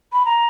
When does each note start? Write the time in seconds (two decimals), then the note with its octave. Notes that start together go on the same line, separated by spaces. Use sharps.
0.13 B5
0.26 A#5